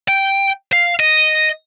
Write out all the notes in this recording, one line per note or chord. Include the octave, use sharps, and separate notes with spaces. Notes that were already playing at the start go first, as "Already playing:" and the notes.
G5
F5
D#5